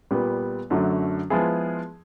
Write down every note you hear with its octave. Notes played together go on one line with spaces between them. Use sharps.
A#2 G3 B3
F#2 D3 F#3 A3
F3 G#3 B3 E4 G#4